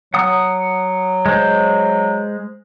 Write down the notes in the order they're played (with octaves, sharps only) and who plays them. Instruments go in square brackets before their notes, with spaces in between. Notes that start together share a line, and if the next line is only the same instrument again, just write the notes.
[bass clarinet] F#3 [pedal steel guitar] F#5 D#6
[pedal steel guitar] G#3 C5